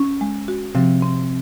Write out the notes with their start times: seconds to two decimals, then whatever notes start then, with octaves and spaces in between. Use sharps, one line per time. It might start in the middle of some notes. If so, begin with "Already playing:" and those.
Already playing: C#4
0.21 G#3
0.48 F#4
0.75 C3 F3
1.02 C4